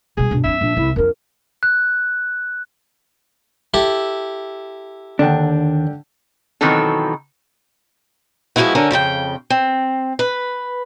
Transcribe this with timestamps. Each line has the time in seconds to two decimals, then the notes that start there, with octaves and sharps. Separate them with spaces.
0.17 B2 G3 G#4
0.31 G2 B2 D4
0.44 F#3 C4 E5
0.61 A#2 F3 D4
0.77 C2 E4
0.96 F2 D4 A#4
1.63 F#6
3.74 E4 G4 A4
5.19 D#2 D3 D4 F#5 G5
6.61 B2 D#3 E3 F#3 C4 A4
8.56 F3 G#3 A#3 B3 E4 F#4
8.75 D3 C#4 A4 A#4
8.91 F2 C#3 G#4 G5
9.50 C4
10.19 B4